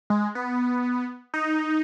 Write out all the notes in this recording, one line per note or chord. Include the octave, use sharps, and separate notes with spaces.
G#3
B3
D#4